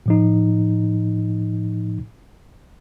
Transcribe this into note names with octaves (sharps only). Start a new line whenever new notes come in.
A2 F3 D#4